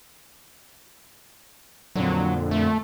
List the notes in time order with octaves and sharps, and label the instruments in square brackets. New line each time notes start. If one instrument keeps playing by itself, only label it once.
[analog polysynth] F2 A#2 D3 [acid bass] F#3
[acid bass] A3